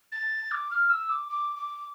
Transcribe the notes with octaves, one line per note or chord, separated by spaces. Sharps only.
A6
D6
F6
E6
D6
D6
D6